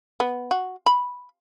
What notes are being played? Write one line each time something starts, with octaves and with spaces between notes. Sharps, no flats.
B3
F#4
B5